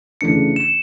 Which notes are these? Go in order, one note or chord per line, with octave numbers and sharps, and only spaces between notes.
C#3 E3 A3 D4 C#7
E7